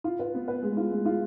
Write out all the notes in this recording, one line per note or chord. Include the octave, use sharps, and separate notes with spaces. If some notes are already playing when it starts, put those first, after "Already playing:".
F4
B4
B3
B4
G#3
F4
G#3
F4